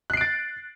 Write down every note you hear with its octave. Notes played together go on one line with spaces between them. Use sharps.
F#6 A6 C7 D7